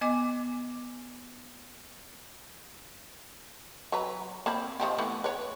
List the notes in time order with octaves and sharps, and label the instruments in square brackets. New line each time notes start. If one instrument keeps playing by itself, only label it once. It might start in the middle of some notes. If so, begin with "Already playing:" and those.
[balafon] B3 D#5 G#5 D6
[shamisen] F#3 B4 A#5
A#3 C4 B5
D#3 F3 G4
E3 A3 B3
B4 C#5